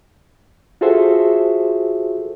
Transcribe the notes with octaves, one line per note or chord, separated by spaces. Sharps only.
F4 F#4 G#4 A4 C5 E5